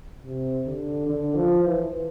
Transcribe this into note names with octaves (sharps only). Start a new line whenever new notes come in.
C3
D3
D3
F3
E3